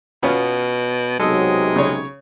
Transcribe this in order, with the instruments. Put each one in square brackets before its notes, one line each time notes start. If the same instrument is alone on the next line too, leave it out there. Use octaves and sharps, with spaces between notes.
[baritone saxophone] B2 [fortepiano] B3 C#4 F4
[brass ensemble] B1 C3 F#3 [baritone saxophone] G#3 [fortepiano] A4 D#5
[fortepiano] C#3 C#5